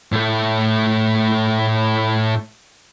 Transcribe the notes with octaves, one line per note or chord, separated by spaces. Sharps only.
A2 A3